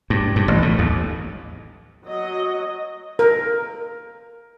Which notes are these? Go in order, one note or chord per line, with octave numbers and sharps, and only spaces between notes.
G2
G2
A1
A2
D#2
F#3 D#5
A#4